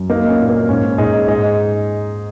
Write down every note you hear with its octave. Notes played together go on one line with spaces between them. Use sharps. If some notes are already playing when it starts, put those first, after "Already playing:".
Already playing: F#2
A#3 D#4
C#4
A#2
A#3
G#2 C#4
G#2 D#4 G#4
G#2 D#4 G#4